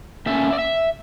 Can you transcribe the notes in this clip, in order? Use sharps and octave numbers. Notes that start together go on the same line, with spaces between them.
A#2 A3 C#4 E5
D5
E5